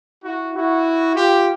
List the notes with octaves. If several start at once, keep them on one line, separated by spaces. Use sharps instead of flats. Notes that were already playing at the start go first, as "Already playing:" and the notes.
E4 F#4
E4 F#4
F4 G4